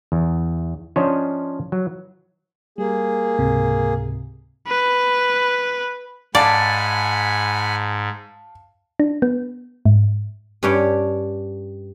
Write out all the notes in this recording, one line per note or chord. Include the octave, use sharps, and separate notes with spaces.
E2
F3 C#4 D4 C5 C#5 D#5
F#3
G3 A#3 G#4
C#2 G#2 C3
B4
G#2 D5 F5 F#5 G#5 A5 B5
D4
B3
G#2
G2 C#4 D4 G4 C#5 G5